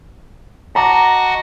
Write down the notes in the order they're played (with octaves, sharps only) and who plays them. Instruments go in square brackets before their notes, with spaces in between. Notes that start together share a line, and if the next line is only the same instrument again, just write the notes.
[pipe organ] F#4 D#5 F#5 [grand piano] A5 A#5 D6